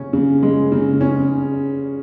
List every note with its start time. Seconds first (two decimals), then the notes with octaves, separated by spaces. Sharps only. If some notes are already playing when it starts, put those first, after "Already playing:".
Already playing: C#3 C#4
0.13 C#3
0.42 G#3
0.72 C#3
1.01 C#4